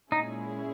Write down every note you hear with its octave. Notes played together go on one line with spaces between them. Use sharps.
A#2 G#3 C#4 D#4 E4 G#4